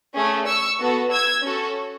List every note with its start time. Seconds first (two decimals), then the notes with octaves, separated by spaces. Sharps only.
0.14 A3 C#4 G#4
0.47 C#6 E6
0.79 B3 F#4 A4
1.11 E6 G#6
1.43 C#4 F#4 A4